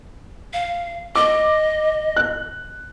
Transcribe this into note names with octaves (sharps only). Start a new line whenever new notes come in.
F5
D#5 D6
F#6